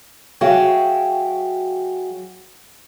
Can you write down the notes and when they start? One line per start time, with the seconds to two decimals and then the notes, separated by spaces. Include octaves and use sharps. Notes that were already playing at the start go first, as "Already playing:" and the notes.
0.41 F#3 F#4 G#4 E5 F5 G5